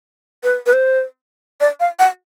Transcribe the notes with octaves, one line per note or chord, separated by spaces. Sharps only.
B4
B4
C5
D5
F5
F#5